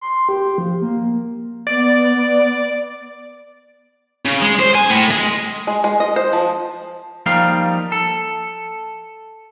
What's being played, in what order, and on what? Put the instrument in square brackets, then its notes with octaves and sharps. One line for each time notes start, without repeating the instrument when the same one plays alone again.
[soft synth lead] C6
G4
F3
A#3
[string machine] B3 [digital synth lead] D5
[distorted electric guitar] C#3
G#3
C5
G#5
A2
G#3
[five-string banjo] G#3
G#3
D#5
C5
F3
[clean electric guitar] F3 G3 A#3 D#4 F5
A4